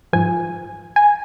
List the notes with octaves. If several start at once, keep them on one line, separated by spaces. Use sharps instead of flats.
G#2 F3 G#5
G#5